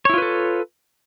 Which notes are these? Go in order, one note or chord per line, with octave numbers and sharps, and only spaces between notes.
E4 F4 A4 B4 C#5